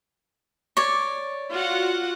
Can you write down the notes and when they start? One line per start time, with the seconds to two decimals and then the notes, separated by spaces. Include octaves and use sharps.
0.77 C#5 D5
1.51 F4 F#4 F#5